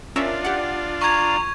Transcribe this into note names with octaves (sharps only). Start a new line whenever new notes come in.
C#4 D4 F4 A#4 E5
G4 D5 F#5
A#5 C#6 G#6